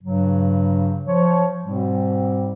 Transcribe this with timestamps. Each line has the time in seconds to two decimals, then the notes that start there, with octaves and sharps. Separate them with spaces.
0.02 G2 C#3 F#3
1.05 F3 C#5
1.64 G#2 B2 G3 C4